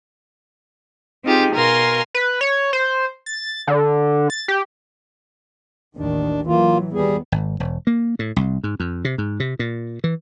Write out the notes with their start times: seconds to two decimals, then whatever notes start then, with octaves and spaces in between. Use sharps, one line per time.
1.24 C4 D#4 F4 G4 G#4
1.53 B2 A#4 F5 G#5 C6 A#6
2.14 B4
2.41 C#5
2.73 C5
3.26 A6
3.67 D3
4.30 A6
4.48 G4
5.97 A1 D#2 D#3 D4
6.47 E3 F#3 A#3 F4
6.94 D#2 G3 B3 G#4
7.32 G#1
7.60 E1
7.87 A#3
8.19 A2
8.36 C2
8.64 G#2
8.80 F2
9.05 C3
9.18 G#2
9.40 C3
9.59 A#2
10.04 E3